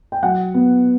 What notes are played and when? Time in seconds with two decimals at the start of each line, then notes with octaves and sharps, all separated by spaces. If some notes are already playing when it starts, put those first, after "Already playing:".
0.12 G5
0.23 F#3 F#5
0.54 B3